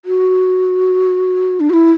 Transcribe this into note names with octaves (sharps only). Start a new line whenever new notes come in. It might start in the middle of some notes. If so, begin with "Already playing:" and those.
F#4
D4
F#4
E4